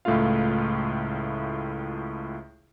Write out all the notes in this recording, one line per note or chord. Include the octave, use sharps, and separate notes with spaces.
C#2 A2 A3 E4 F4 F5